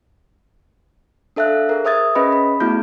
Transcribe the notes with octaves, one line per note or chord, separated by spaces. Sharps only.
D4 A4 E5 F5 F#6
G#4 A#4
C5 E5 D#6 G#6 A6
C#4 G#4 B4 D#5 B5
B5
A3 B3 E4 F#4 G#4 G6